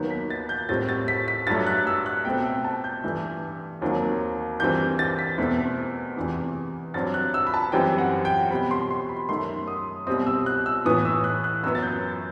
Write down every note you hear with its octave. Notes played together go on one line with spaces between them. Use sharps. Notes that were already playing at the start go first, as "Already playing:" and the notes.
Already playing: D#2 D#3 F#3 B3 G6
B6
A6
G6
A2 G3 C4 A6
A6
B6
B6
G2 F#3 A3 A6
F#6
E6
F#6
B2 A3 C4 G5
G5
A5
G6
G2 E3 A3
D#2 D#3 F#3 C4
G2 E3 G3 C4 G6
A6
B6
E2 B2 A3 C4
E2 C3 E3 B3
G2 F#3 C4 A6
F#6
E6
B5
A5
F#2 E3 G3 C4 G5
F#5
G5
B2 G3 C4 B5
C6
C6
B5
F#2 D#3 A3 C6
D#6
C2 B2 G3 C4 D#6
E6
F#6
E6
A2 E3 B3 D#6
E6
F#6
F#6
F#2 F#3 B3 E6
A6
G6